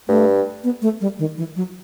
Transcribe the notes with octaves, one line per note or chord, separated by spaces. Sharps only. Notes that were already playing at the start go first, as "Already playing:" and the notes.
G2 A3
B3
A3
G3
D#3
E3
F#3